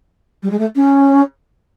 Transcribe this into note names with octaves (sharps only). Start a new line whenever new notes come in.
G3
G#3
A3
C#4